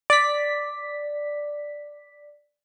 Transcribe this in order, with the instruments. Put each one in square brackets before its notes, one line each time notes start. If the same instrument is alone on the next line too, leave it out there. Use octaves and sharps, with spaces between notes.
[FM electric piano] D5 B6